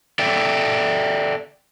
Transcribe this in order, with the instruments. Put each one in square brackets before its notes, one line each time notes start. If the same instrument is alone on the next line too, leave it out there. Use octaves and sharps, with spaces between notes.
[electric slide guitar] A4 D5 E5 G5